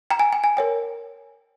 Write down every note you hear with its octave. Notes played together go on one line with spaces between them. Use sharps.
G5 A#5
G#5
G5
G#5
A#4 C#5 G5